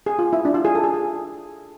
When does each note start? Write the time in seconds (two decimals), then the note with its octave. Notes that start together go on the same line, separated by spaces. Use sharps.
0.06 G#4
0.19 F4
0.33 E4
0.45 D4
0.54 F4
0.65 G#4
0.75 A4
0.84 G#4
0.94 G#4